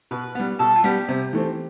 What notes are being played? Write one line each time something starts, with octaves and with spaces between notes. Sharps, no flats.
B2 B4
G3 B3
B2 A4
F4
G3 B3 G4
C3
E3 A3 C4